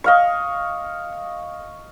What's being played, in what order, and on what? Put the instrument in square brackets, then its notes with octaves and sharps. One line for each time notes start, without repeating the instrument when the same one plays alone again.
[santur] D#5 F5 C#6